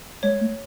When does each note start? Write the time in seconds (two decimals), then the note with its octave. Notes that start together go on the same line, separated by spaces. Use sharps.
0.23 G#3 C#5
0.41 A3